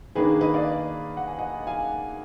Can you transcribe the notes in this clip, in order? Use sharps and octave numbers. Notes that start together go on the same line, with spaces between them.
D#3 A#3 D4 G#4 B4
B4 D#5
D5 F5
F#5
G#5
D#5 F#5
F5 G#5